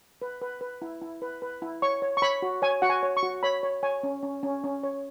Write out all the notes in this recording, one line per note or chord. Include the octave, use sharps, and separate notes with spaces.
B4
B4
B4
E4
E4
B4
B4
E4
C#5 C#6
C#5
C#6
C#5 B5
F#4
C#5 G#5
F#4 F#5
G#5
C#5
C#6
F#4
C#5 B5
C#5
C#5 G#5
C#4
C#4
C#4
C#4
C#5